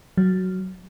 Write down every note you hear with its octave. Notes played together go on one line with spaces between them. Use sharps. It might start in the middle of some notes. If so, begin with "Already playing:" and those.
F#3